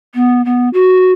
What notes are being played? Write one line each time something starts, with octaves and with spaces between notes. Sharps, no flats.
B3
B3
F#4